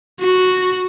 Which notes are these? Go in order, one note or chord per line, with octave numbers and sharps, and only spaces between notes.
F#4